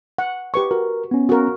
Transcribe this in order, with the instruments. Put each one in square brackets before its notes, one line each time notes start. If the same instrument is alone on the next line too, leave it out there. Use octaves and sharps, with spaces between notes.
[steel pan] F#5
G4 B4 C#6
[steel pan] F#4 [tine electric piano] A#4
[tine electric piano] B3 C#4
[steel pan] F#4 A#4